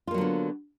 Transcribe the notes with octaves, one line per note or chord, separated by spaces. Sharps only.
D3 F#3 A#3 B3 F4